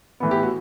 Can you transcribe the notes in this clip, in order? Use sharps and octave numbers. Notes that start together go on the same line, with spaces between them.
A2 E3 B3
G4
F#4